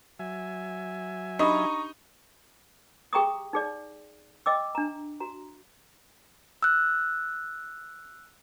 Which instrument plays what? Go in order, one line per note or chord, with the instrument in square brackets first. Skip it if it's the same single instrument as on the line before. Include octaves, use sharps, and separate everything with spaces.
[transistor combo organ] F#3 E5 G#5
[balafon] D4 G4 B5 [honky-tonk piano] D#4 [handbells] A#5 C#6 D#6
[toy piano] G4 G#4 G5 A#5 C#6 D#6
D#4 G#4 D5
D#5 G5 D6 E6
D4 A#5
F#4 A#5
[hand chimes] E6 F#6